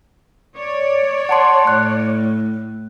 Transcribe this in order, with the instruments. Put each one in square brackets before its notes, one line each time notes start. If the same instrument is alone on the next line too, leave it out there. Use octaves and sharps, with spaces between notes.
[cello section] C#5 D5
[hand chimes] F#5 A5 C6
[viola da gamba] A2 [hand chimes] F#6